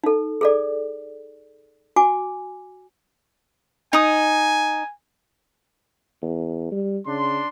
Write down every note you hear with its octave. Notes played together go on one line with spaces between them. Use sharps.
D#4 A4
G#4 A4 D5
F#4 G#5 D6
D#4 G#5 D#6
E2
G3
C#3 D4 C6